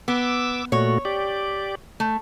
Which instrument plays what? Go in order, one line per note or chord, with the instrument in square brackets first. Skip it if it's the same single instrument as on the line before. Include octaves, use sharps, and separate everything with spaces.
[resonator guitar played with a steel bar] B3 [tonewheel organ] D6 E6
[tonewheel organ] A#2 A3 F#4 [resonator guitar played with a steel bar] C#5
[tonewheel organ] G4 D5
[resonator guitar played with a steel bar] A3